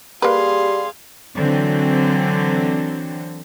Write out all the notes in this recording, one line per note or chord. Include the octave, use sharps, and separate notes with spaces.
G3 A#3 G#4 B4 F5 C6
D3 E3 F#3 C4